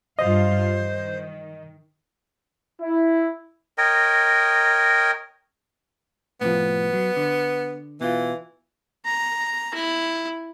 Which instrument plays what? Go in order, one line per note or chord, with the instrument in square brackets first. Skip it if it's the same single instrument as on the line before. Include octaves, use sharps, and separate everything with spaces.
[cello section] G2 F4 F5 [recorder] C5 [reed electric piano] D#5
[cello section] D#3
[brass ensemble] E4
[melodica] A#4 C#5 D#5 G5
[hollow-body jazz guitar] A2 C3 F3 [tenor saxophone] B3
[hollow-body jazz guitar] F#3
D3
[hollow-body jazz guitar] B2 F4 [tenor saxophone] E3
[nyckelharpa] A#5
E4